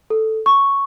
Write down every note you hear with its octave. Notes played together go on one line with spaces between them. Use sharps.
A4
C#6